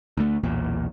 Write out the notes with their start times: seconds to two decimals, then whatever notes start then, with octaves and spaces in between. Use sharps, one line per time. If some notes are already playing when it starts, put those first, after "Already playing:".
0.17 D2 A3
0.43 B1 E2 A#2